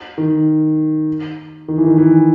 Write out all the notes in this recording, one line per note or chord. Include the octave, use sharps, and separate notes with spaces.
D#3
D#3
E3
D#3
E3